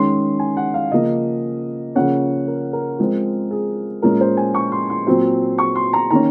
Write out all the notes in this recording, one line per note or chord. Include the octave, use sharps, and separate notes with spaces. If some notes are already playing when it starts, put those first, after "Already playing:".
Already playing: D#3 G#3 C#4 C6
G#5
F#5
F5
C#3 F3 A#3 D#5
C#3 F3 A#3 C#4 F#5
A#4
A#4
F3 G#3 C4
G#4
A#2 G#3 C#4 A#4
C5
G#5
C#6
C6
C6
A#2 F#3 C4
C#6
C6
A#5
D#3 A#3 C#4 A#5